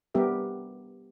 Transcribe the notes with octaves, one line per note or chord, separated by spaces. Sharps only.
G3 B3 G4 A#4 E5